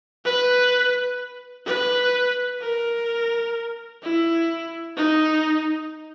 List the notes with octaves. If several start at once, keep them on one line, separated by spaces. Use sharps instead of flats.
B4
B4
A#4
E4
D#4